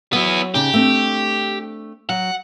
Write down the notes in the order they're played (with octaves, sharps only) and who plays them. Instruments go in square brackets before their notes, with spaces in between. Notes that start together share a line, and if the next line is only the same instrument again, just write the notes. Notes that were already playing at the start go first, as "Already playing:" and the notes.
[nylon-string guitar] F#3 C#5 F#5 [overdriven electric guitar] B3 E4
[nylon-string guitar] C#3 D#4 [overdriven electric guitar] G4
[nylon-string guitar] A3 C4 D4
[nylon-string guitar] F#3 [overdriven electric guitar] F#5